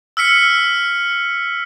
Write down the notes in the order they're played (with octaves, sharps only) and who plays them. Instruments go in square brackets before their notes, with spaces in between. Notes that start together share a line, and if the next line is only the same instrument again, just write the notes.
[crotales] E6 F6 B6 C#7